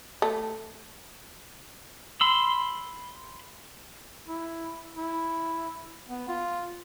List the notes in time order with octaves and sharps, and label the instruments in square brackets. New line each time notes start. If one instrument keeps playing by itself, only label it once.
[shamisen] A3
[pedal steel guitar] B5 C6 E6
[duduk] E4
E4
B3
F4